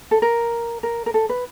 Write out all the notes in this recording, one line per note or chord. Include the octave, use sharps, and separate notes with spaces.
A4
A#4
A#4
A#4
A4
B4